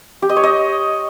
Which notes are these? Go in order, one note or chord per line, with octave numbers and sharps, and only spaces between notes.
G4
D#5
C#5
D#5